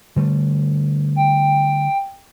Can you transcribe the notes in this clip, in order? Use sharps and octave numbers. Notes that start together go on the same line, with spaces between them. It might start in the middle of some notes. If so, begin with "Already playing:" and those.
D3 G3 A3
G5